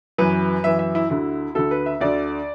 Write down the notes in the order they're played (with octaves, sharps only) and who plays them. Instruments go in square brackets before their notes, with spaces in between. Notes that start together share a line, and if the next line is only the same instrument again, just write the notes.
[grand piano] F#2 E3 B4
F#2 E3 E5
E5
E4
D2 D3 E4
D2 D3 A4
B4
E5
D2 D3 D5